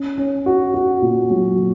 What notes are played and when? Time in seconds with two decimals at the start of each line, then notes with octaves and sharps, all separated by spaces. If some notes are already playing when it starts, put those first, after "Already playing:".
Already playing: C#4
0.18 C#4
0.46 F#4
0.74 F#4
1.02 A#2
1.30 F#3
1.58 A#2